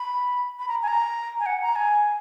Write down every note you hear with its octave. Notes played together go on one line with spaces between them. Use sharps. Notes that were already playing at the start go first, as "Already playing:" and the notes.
Already playing: B5
B5
A#5
G#5
A#5
G#5
F#5
A#5
G#5